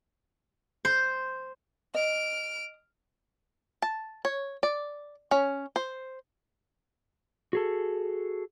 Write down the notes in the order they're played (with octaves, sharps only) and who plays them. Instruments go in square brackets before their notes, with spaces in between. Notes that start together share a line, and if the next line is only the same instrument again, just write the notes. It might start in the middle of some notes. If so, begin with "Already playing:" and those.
[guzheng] C5
[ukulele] D#5 [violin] F6 D7
[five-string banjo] A5
C#5
D5
C#4
C5
[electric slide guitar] F#4 G#4 A4